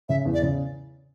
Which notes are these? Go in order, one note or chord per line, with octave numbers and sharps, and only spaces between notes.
C#3 E5
E2
D5
C#3